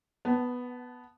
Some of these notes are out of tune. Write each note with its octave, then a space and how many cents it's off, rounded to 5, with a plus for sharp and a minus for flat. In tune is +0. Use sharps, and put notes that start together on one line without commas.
B3 +0 F#5 +30 A5 +0